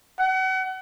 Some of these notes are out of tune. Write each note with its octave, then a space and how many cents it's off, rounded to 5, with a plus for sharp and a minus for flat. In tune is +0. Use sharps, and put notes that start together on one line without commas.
F#5 +35